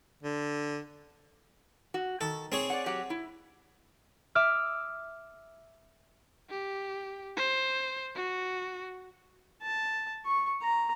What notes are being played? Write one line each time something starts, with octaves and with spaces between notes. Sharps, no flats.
D3
F#4
D#3 A4
C4 G#4 C#5
D5 F#5
F#3 G4 F#5
E4
E5 D6 F6
G4
C5
F#4
A5
C#6
A#5